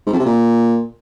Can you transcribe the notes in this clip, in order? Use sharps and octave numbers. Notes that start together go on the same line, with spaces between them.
G#2
F2
C3
A#2